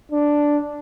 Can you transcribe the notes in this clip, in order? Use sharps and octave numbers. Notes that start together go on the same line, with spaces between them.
D4